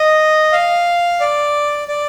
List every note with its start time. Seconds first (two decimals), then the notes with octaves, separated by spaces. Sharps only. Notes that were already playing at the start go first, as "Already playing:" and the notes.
Already playing: D#5
0.52 F5
1.20 D5
1.88 D5